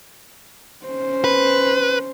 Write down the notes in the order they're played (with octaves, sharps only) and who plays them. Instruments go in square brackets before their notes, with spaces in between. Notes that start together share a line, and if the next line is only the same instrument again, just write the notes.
[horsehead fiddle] C#4 C5
[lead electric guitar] B4